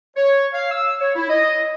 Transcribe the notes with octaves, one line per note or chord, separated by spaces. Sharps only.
C#5
F5
E6
C#5
E4
D#5